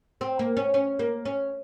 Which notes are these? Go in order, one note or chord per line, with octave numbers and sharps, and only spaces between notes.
C4
A#3
C#4
C#4
A#3
C#4